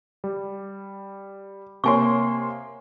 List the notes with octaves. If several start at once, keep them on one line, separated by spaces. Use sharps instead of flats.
G3
C3 A#3 C#5 G#5 C6 C#6